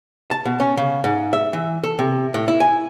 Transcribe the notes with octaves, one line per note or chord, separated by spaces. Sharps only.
A5
B2
C#4
C#3
G#2
E5
E3
A4
C3
A2
E4
G#5